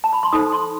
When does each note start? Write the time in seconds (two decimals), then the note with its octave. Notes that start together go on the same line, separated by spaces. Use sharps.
0.04 A5
0.13 B5
0.23 C6
0.32 D#4 A4 C5 D#6
0.52 C6